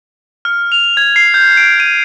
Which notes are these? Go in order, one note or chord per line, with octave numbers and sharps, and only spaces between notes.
F6
F7
G#6
C7
G6
D7
D#7